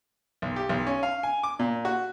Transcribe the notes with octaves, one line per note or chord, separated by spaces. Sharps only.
B1
G4
B1
C#4
F5
G#5
D6
A#2
F#4